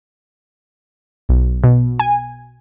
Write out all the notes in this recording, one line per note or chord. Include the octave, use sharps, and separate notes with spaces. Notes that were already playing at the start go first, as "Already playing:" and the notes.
B1
B2
G#5